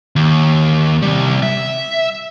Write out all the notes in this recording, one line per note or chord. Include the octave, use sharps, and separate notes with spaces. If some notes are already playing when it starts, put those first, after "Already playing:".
D#2
C3 G3
E5